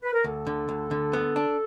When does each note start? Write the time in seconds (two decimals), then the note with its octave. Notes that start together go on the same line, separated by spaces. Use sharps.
0.03 B4
0.13 A#4
0.24 D2 A4
0.47 D3
0.69 D2
0.91 D3
1.13 B3
1.36 D4